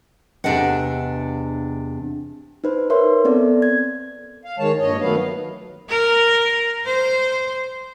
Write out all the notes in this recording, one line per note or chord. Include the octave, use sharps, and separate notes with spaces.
E2 C3 D4 A4 D#5 F#5
D#4 B4 C5
A#4 C5 C#5 E5 C6
B3 C4 A4 D5
G#6
F5
D#3 G#3 C#5 A5
G2 A#2 C#5 D#5
D#3 F#3 A3 B3 B4 F5
A#4
C5